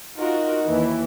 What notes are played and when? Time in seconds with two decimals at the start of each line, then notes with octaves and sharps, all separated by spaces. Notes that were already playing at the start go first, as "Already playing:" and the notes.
0.18 D#4 F4 F#4 A#4
0.65 D#2 E3